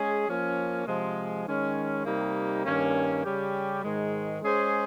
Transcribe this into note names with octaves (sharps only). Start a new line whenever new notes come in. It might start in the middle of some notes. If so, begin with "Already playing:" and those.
Already playing: G#3 C#4 G#4
F3 A#3 C#4
C3 F3 G#3
D#3 G#3 C#4
C3 G3 A#3 D#4
G2 D#3 A#3 C#4
C#3 G3 C#4 G4
G#2 D#3 G#3
G#3 C#4 G#4 C5